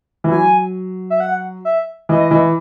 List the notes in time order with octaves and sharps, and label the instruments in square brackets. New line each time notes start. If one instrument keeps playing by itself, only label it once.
[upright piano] E3
[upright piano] F#3 [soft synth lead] G#5
[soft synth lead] E5
F#5
E5
[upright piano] E3 [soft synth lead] D#5
[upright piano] E3